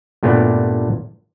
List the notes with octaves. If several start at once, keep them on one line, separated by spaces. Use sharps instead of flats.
G2 A#2 A3 B3 D4